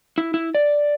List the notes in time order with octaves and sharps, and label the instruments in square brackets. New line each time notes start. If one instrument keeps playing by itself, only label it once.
[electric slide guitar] E4
E4
D5